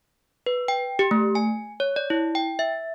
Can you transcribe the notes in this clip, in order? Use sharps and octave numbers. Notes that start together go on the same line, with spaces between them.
B4
G5
G4
A3
G#5
C#5
D5
E4
G5
E5